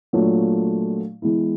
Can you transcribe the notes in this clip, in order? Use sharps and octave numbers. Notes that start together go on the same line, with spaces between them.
A#2 F#3 A3 D4 F4
E3 G#3 B3 E4